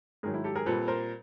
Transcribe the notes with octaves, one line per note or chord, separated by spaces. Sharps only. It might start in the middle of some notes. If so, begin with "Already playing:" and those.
G#2 D#3 F#3 G#4 A#4
E4
G4 A4
G#4 A#4
A#2 G3 C4 A4 B4
A#4 C5